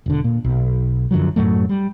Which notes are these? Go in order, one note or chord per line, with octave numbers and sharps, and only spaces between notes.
E1 D3
A#2
B1
F#2 D3 F3 F#3
F#2 A2 F#3 A3
G3